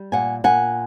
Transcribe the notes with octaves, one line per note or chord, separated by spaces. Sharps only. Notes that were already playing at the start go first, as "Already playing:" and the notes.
Already playing: G3
A#2 F#5 G#5
A#2 F#5 G#5